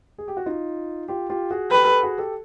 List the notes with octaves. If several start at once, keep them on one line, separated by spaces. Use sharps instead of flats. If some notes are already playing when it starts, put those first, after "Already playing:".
G#4
G4
F#4
D#4 F4
F4 G4
F4 G4
F#4 G#4
G4 A4 B4
G4 A4
F#4 G#4
G4 A4